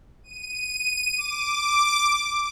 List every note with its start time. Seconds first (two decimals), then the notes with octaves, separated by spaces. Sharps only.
0.23 D#7
1.17 D6